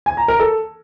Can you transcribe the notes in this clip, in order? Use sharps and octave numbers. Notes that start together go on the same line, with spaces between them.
G#5
A#5
A#4
A4